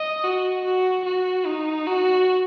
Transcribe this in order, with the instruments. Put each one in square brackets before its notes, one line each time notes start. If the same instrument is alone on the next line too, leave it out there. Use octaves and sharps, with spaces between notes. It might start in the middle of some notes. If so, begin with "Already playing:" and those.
Already playing: [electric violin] D#5
F#4
F#4
F#4
D#4
F#4